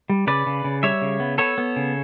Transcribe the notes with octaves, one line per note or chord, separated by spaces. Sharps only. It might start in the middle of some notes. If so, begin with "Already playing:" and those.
G3
C#3 B4 D5
C#3
C#3
G3 C#5 E5
C#3
B3
B3 A4 C#5
B3
C#3